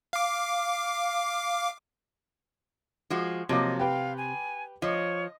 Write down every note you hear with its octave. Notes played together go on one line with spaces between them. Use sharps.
F5 D6
F3 G#3 F#4
C3 F3 F#3 A#3 D#5
G4 B4 F5 G5
G#5
F3 C#5 D#5